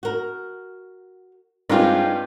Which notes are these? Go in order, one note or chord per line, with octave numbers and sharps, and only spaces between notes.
F#4 A#4
G2 G#3 C4 D#4 F4 G4